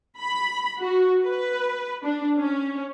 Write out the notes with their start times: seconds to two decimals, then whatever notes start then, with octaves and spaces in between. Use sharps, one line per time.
0.18 B5
0.80 F#4
1.23 B4
2.03 D4
2.38 C#4